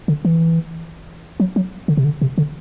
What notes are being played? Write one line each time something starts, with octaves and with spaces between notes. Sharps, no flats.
D3
E3
F#3
F#3
D3
C3
D3
C3
D3